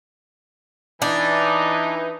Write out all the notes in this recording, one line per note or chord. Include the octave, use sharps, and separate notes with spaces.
E3 D4 D#4